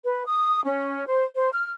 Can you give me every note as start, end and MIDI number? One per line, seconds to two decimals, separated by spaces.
0.03 0.25 71
0.26 0.60 87
0.65 1.05 61
1.07 1.25 72
1.35 1.50 72
1.53 1.71 89